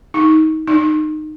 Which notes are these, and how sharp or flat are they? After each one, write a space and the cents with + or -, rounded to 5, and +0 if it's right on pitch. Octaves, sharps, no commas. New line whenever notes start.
D#4 +20
D#4 -20